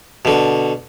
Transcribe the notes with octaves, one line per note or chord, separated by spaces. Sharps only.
B2 D3